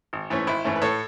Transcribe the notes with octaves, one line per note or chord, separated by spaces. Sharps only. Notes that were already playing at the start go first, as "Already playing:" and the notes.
G#1
G#2 E3 A3 C#4
G#1 E4
G#2 E3 A3 C#4
B4
A2 A4 C#5